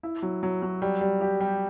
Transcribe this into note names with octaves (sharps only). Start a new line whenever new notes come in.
E4
F#3
F#3
F#3
G3
G3
G4
G3